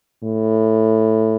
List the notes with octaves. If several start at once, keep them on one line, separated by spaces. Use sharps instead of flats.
A2